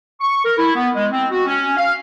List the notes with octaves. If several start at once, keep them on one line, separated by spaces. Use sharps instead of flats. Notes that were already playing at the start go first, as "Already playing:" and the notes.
C#6
A#4
E4
B3
G#3
C4
F#4
C#4
F5